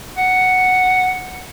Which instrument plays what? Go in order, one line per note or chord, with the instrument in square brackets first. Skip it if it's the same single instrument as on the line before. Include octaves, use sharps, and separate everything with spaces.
[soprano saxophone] F#5